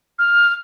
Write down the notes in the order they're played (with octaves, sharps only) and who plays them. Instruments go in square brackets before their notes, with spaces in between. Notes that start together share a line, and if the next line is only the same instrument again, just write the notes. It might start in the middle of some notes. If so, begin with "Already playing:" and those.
[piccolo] F6